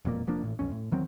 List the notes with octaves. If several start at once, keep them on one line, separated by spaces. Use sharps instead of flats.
E1 F2 A#2 A#3
F1 F3 A#3 D4
A1 A2
B1 F2 C#4
A2
E2 D#3 F#3 C4